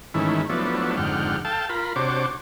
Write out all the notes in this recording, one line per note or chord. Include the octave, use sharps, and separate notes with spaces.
G#2 D#3 E3 A3 C#4 E4
F3 F#3 A3 B3 D4 E4
F2 G#2 D3 F#5 G5 F6
A4 F5 G5 A5
F4 A#4 B5
C3 D4 F#4 C5 C#5 D6